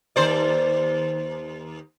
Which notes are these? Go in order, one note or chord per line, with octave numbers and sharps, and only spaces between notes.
D#2 C5 D5